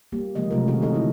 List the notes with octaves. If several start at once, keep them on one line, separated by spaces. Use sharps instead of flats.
G3 A#3 G4
C#3 F3 G#3 A#3 D#5
C3 F#3 A3 D#4 F4 A#4
B2 D#3 F#4 G#4 A#4
E3 D#4 A4 D#5
D3 D#4 E4